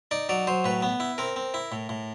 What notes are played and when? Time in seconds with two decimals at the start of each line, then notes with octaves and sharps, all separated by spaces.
0.11 D#4 D5
0.29 F#3 D5
0.47 F#3 C5
0.65 A2 B4
0.82 B3
1.00 E4
1.18 C4 A#4
1.36 C4
1.54 E4
1.72 A2
1.89 A2